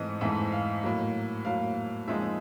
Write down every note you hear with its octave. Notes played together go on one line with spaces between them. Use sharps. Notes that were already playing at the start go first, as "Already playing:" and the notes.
Already playing: G#2 E3 A3 C4 D#5
G#2 E3 A3 C4 E5
F5
A2 F#3 A#3
A2 F#3 A#3 F5
A#2 F3 G#3 C4 D#4 E5